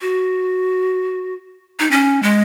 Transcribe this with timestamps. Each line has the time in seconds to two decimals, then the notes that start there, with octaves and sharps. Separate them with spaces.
0.01 F#4
1.79 D#4
1.91 C#4
2.23 G#3